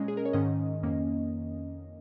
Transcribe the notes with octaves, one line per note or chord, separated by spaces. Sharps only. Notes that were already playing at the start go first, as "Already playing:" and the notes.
Already playing: A#2 G#3 C#4 D#5
G#4
A#4
C#5
G#2 D#3 C#4 D#5
F2 D#3 A#3 C#4